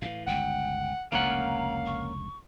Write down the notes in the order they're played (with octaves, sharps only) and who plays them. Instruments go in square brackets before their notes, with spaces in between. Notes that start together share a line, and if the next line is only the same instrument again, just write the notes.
[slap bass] A2 D#3 E3 [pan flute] F5
[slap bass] G1 C#2 [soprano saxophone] F#5 [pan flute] G5
[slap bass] F1 C#2 D3 [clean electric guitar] A#3 C#4 F#5 [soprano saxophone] F5 [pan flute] A#5
[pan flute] C#6